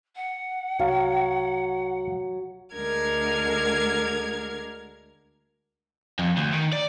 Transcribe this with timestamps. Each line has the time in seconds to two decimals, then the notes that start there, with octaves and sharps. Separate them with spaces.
0.16 F#5
0.79 C2 F#3 F5
2.75 D2 D3 G#3 A#4 F6 G#6
6.19 F2
6.37 D2
6.52 D#3
6.73 D5